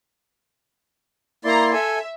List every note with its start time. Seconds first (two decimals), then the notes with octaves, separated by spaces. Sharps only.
1.45 A#3 E4 D5 A#5 C6
1.73 A4 E5 G#5